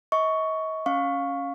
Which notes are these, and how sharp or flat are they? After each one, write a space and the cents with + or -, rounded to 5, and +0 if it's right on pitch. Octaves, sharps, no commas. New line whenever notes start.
D#5 +40 C#6 +10
C#4 +0 F5 +15 C#6 +0